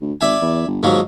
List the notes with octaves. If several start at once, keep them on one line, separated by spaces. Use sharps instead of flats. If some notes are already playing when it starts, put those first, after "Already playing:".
D2
G#1 D5 E5 G#5
E2
G1
D#2 G#2 F3 F#3